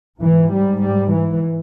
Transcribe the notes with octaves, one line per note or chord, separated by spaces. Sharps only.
G#2 E3
G3
G3
E3